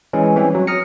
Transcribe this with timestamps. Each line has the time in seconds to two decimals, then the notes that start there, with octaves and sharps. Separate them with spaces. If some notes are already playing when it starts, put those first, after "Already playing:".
0.13 E3 G#3 C#4
0.36 E3 G3 C4
0.55 F#3
0.67 D#6 F6 A#6 C#7